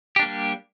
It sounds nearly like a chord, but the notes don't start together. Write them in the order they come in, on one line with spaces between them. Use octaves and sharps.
G4 D4 A#3 G3